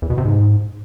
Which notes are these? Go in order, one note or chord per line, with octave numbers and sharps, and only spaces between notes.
E2
B2
C3
G#2